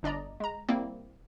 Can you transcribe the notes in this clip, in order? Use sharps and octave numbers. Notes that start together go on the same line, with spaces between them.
G1 D4 D5 D#5 A#5
G#3 A#5
G3 A#3 C4 E4